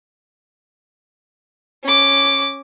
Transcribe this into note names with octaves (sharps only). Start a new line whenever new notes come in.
C#4 D6